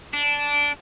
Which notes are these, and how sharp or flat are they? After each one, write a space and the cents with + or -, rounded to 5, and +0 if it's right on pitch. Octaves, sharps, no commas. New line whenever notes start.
D4 -15